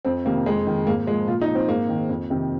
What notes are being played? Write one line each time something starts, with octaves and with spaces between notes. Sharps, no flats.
F2 C4
C3 D#3 A#3
F2 G#3
D#3
G#2 A#3
F3 G#3
A#2 F4
D#4
F3
C4
G#2 A#3
D#3
F2
C3 D#3